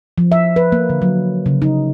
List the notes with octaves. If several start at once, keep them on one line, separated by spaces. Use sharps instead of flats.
F3
E5
B4
A#3
D3
F#3
C#3
D#4